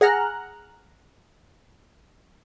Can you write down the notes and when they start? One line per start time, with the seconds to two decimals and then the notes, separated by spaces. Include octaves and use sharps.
0.01 G#4 F#5 A#5 F6 F#6